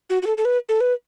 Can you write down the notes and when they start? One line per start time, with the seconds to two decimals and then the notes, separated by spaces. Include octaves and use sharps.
0.10 F#4
0.22 F#4
0.27 A4
0.38 A4
0.45 B4
0.69 A4
0.81 B4